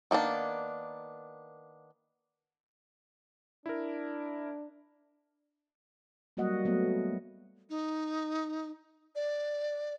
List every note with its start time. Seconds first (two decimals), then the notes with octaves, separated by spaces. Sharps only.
0.11 D#3 A#3 B3 D4
3.66 D4 E4 A#4
6.37 F#3 G3 A#3 F#4 D#5 F#5
6.65 F#3 A3 B3
7.70 D#4
9.15 D5